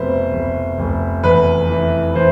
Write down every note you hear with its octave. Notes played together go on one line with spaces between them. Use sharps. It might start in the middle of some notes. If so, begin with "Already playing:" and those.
Already playing: F1 B2 B4 C5
F1
F1
E2 B4
E3
E3 C5